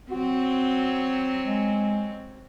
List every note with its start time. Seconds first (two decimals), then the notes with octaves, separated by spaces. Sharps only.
0.12 F#3 C4 F#4
1.45 G#3